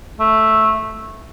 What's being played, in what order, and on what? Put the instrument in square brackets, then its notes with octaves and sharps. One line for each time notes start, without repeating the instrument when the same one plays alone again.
[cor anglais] A3